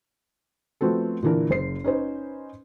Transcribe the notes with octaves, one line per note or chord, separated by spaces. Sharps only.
F3 A3 B3 C4 F#4 A4
A#2 D3 E3 D4 A#4
F#1 C5 C7
C#4 D#4 B4 C5